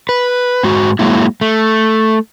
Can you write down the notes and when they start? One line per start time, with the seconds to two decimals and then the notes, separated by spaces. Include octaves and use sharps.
0.09 B4
0.63 G#2 G#3 F#4
0.99 F#3 G#3 A#3 E4
1.41 A3